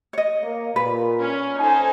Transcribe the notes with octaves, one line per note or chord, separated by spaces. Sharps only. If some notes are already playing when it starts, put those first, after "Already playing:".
C#5 D#5
A#3
A#2 B4
C#4
D#4 A4 C5 G#5